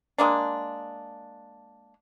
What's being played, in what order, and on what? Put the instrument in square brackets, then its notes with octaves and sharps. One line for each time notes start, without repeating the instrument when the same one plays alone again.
[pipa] G#3 A#3 D4